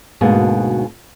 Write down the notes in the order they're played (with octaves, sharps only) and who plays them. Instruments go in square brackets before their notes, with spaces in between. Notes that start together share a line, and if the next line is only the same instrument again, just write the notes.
[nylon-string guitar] D2 G#2 B2 A#3 G#4 A5